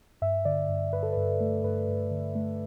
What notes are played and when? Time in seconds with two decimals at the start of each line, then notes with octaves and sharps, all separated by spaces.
0.22 G2 E5
0.45 D3 D5
0.69 G2
0.93 G2 B4
1.03 A4
1.13 G2 B4
1.40 A3
1.64 G2 B4
1.88 G2
2.11 D3
2.35 A3